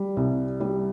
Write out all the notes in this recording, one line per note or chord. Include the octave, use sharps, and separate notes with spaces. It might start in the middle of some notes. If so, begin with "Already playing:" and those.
Already playing: G3
C2
G3